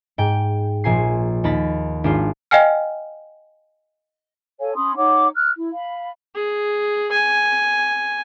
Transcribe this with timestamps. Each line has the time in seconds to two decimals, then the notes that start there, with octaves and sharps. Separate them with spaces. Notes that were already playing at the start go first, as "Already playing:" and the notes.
0.18 G#2 G5
0.84 A#1 A#2 G#5 C7
1.44 D#2 D#4 B5 A6 A#6
2.04 G#1 D4 F4
2.51 D#5 F5 G5 G#5 F6
4.59 A4 C#5 F5 G#5
4.75 C#4 B5 C6 D#6
4.96 D#4 C#5 F#5 D6
5.34 F6 F#6
5.54 E4
5.72 F5 B5
6.35 G#4
7.11 G#5